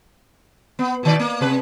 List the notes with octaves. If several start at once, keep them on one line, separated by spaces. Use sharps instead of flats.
B3
B2 D#3 D5
A#3
C3 B4